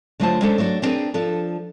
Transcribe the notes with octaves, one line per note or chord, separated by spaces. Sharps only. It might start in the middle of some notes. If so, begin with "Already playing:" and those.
D3 F#3 A3 F4 C5 A5
G#3 C#4 D4 A4 C5
F#3 A3 D4 F#4
B3 C4 D4 G#4 A#4 B4
F3 D4 A4